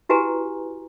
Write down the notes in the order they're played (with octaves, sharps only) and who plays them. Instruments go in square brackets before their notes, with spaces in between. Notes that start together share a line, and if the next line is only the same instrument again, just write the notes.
[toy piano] E4 F#4 G4 B4 G#5 A#5